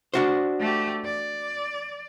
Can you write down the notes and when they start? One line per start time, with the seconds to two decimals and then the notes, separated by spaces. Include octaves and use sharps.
0.14 D4 F#4 C5
0.60 A3 G4
1.05 D5